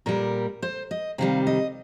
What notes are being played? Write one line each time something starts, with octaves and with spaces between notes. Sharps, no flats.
A#2 G3 A#4
C5
D#5
C3 D#3 G3 F5
D#5